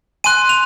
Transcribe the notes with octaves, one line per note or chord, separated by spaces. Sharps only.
G#5 C6 F#6 D#7
F7